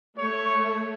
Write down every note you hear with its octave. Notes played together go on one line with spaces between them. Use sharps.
A3 C#5